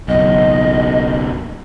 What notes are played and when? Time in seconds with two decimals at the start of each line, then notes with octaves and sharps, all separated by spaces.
0.08 F#1 B1 D#5